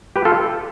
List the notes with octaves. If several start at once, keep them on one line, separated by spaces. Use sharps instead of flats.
G4 B4
F4 A4